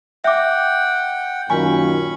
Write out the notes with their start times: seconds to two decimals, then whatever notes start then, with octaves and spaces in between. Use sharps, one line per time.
0.24 E5 F#5 G5 D6
1.50 F#2 A#2 D#3 C#4 G#5 B5 C#6